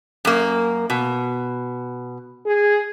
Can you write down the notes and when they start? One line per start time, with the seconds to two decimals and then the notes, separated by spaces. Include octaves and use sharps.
0.25 F#2 A#3
0.90 B2
2.46 G#4